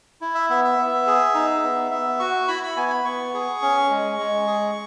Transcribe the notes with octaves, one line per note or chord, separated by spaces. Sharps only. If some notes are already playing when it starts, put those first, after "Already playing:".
E4
E5
B3 E5
E5
B3
G#4
D#4
B3
B3 E5
F#4 C#6
E4 B5
B5
B3 G#5
B5
B3 C#6
G#4
C#4
G#3
G#3
G#4